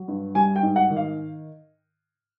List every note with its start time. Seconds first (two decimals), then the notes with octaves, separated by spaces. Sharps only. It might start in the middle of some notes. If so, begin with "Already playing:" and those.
Already playing: F#3
0.08 G2
0.35 G3 G#5
0.56 G5
0.63 G#2
0.76 F#5
0.90 D#3
0.96 F5